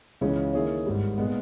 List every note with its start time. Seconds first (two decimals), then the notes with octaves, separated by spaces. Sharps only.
0.21 C#2 C#3 E3 G#3 C#4
0.53 D#3 A#3 E4 G#4 C#5
0.86 G#1 G#2 G3
1.18 A#2 G#3 B3